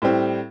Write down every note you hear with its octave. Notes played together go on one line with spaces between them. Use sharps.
A2 G3 C4